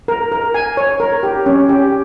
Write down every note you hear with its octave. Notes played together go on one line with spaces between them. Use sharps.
A#4
A#4
G#5
C#5
A#4
G4
C#4
G4